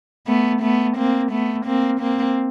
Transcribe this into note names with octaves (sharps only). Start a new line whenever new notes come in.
A3 B3
A3 B3
A#3 C4
A3 B3
A#3 C4
A#3 C4